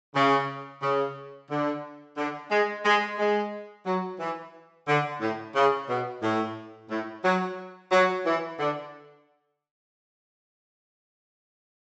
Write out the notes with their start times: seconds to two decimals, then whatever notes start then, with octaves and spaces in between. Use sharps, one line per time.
0.14 C#3
0.82 C#3
1.51 D3
2.18 D3
2.51 G#3
2.85 G#3
3.19 G#3
3.86 F#3
4.20 E3
4.88 D3
5.21 A2
5.55 C#3
5.89 B2
6.22 A2
6.90 A2
7.24 F#3
7.92 F#3
8.25 E3
8.59 D3